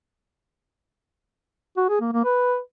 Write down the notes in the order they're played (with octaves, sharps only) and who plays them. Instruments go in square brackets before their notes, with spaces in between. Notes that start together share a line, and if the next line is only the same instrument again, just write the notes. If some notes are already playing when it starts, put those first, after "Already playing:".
[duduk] F#4
G#4
A#3
A#3
B4